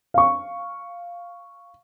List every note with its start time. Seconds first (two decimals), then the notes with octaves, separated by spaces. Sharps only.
0.14 F5 C#6